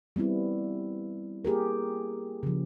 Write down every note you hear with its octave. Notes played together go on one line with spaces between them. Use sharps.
G3 B3 C4 E4
A#3 G4 G#4 A#4
C#3 F3